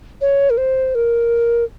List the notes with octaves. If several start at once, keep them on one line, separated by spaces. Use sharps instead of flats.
C#5
A#4
C5
A#4